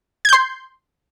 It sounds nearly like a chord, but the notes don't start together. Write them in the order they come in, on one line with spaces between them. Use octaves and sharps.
G#6 G6 C6